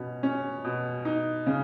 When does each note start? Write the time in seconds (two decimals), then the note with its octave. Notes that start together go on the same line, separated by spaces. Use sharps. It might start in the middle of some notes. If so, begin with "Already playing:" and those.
Already playing: B2 C#4
0.23 C#4
0.64 B2
1.05 D#4
1.47 C#3